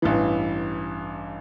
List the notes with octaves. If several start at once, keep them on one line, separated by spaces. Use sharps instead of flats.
A1 G2 E3